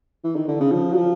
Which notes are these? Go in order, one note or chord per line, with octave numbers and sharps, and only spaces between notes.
E3
D#3
D3
C#3
F3
F#3
F3